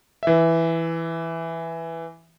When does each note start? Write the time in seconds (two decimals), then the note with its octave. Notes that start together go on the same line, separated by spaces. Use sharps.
0.23 E3 E5